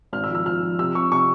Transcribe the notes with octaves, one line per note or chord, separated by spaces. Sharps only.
G#1 F6
E6
F3
E6
F3 F6
F3
C3 E6
C3 C#6
C3 C#6